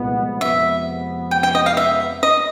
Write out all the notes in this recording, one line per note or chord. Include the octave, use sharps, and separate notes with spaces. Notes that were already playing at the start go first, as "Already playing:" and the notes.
Already playing: C2 A#2 F3 G#3 B3
F2 C3 F3 G#3 B3 E5
G5
G5
D#5
F5
E5
D#5